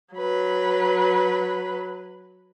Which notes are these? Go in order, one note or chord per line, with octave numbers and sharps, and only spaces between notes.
F#3 B4